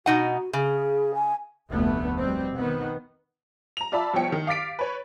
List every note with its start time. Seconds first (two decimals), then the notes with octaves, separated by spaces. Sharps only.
0.06 B2 D#4 F#4 F#5
0.53 C#3 G#4
1.14 G#5
1.70 F1 D2 A3 B3
2.18 B2 G3 C4
2.56 D#3 B3
3.77 A#5 F7
3.92 F4 D5 E5 A5 B5 E6
4.14 C2 F3 B3 C#5 G5 C#7
4.32 D#3
4.47 F5 D6 A6 B6 D7
4.79 B4 C#5